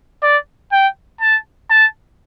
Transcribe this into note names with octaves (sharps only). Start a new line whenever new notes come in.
D5
G5
A5
A5